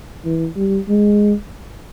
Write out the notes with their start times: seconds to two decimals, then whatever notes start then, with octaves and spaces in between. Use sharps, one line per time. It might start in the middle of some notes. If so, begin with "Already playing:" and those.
0.25 E3
0.56 G3
0.89 G#3